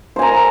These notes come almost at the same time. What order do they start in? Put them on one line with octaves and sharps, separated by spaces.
C5 G#5 A#5 A#4